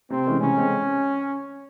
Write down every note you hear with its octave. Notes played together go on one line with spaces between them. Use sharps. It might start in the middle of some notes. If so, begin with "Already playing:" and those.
C3 C4
E3 G#3 C#4
C#3 C#4
G#3 C4